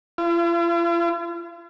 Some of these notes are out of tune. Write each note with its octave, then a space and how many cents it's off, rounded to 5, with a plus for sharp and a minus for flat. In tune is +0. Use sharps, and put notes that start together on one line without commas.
F4 -45